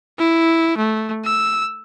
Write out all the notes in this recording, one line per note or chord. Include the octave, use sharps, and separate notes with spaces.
E4
A3
E6